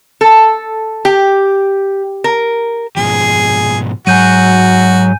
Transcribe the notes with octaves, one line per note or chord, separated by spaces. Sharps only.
A4
G4
A#4
G#2 B2 F3 G#4
G#2 F#3 F#4 G#5 G6 D#7